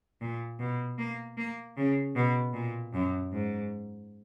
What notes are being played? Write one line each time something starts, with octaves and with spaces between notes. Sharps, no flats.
A#2
B2
A#3
A#3
C#3
B2
A#2
F#2
G#2